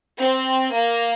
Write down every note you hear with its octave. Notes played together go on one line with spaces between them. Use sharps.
C4
A#3